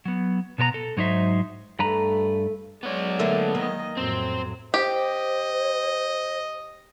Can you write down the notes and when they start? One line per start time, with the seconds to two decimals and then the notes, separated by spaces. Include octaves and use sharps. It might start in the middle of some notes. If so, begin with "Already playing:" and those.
0.06 F#3 B3
0.58 B2 B3 A#4 A#5
0.74 A4
0.97 G#2 F#3 D#4 C5 E5
1.79 G2 A3 B4 A#5
2.83 F#3 G#3 B3 C#5 D5
3.19 D3 A3 A#3
3.55 D#3 A#3 D#5
3.97 F2 A2 F#3 C4
4.74 G4 C5 D#5